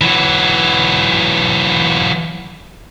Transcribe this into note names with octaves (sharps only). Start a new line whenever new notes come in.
E3 F#3